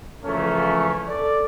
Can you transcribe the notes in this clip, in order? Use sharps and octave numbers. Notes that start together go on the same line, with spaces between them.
C#3 E3 F3 A3 A#3 C#4
A4 D5